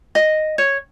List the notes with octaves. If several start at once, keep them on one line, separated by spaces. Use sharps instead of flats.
D#5
C#5